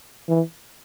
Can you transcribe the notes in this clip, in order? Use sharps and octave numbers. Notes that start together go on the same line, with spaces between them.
E3